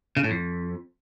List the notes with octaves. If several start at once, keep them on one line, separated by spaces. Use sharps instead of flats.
C#3
A2
F2